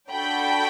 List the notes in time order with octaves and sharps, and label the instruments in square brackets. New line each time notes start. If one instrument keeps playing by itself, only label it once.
[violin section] D4 F#4 A4 G5 B5